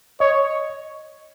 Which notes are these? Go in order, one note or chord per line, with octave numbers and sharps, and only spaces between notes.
C#5 D#5